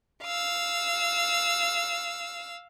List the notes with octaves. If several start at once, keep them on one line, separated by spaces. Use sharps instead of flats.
F5 E6